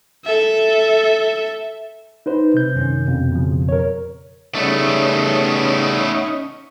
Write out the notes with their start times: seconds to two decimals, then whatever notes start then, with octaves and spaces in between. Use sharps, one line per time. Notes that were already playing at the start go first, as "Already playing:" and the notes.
0.24 A4 E5
2.26 D#4 B4 C5
2.54 C3 G6
2.75 F#2 D#3 C#4
3.07 F2 B2
3.32 C#3 F3
3.69 A#4 C#5
4.55 C#3 G3 A3 B3 C#4 D#4